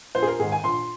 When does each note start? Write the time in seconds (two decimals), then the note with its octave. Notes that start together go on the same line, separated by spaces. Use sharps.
0.15 A#1 C5
0.22 G#4
0.27 A#4
0.40 G#2 D#3 G#4
0.52 G#5
0.64 A#1 C6